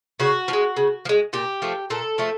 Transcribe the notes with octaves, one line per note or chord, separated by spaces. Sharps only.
C#3 F#4
F3
G#3
C#3
F3
G#3
A#2 G4
F3 A3
A#2 A4
F3 A3